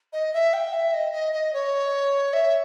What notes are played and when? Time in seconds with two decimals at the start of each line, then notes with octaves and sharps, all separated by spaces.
0.13 D#5
0.34 E5
0.53 G5
0.73 E5
0.94 D#5
1.13 D#5
1.33 D#5
1.53 C#5
2.33 E5